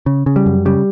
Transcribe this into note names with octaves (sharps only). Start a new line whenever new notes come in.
C#3
C#3
G3
F#2
C#3 G3